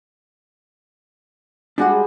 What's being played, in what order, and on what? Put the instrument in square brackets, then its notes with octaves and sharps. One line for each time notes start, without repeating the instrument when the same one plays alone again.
[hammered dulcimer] G3 G#3 [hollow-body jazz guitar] D4 F#4 F#5